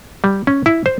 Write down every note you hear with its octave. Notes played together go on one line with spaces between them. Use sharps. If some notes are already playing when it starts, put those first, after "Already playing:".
G3
C#4
E4
C5